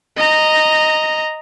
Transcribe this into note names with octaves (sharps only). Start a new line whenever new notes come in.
D#5 A#5